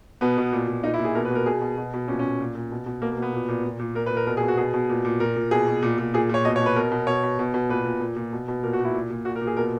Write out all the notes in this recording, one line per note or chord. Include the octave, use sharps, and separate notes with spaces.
B2 B3
B2
A#2
A#2
A#2 D#4
E4
A#2
G#4
B2 A#4
B4
B2
A#4
B2 G#4
B2
B2
B2
A#2 C#4
C#4
A#2
A#2
A#2
B2
B2
B2 A#3
A#3
B2 B3
A#2
A#2
A#2
A#2
A#2 A#4
B4
A#2
A#4
B2 A#4
G#4
B2
F#4
B2 G#4
B2
A#2
A#2
A#2 A#4
A#2
B2 G#4
B2
A#2
A#2
A#2 G#4
A#2 C#5
B2 D#5
C#5
B2 B4
B2 A#4
B2
B2 C#5
B2
B2
B2
A#2 B4
A#2
A#2
A#2
B2
B2
A#2 A#4
F#4
A#2
E4
A#2
A#2
A#2 F#4
A#4
A#2
G#4
B2 A#4